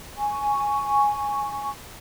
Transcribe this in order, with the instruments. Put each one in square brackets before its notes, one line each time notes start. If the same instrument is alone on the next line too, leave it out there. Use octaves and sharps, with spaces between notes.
[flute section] G#5 C#6